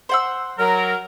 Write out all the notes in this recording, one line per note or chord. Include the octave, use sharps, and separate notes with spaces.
C5 F#5 E6
F#3 A#4